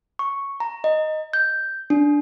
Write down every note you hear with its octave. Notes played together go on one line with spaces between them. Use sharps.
C#6
A#5
D#5
G6
D4